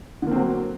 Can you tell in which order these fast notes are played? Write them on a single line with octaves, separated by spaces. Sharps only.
D3 A#3 C4 F#3